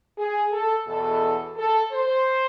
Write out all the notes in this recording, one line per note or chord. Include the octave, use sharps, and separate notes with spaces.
G#4
A4
E2 B2 A4
A4
C5